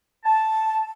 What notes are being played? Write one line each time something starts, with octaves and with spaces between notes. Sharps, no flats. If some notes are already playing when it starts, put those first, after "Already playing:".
A5